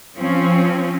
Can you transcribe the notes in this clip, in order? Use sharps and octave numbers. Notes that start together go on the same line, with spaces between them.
F3 C4 C#4